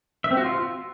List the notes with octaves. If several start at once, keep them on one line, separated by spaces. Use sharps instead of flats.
E5
C4
F#4
F4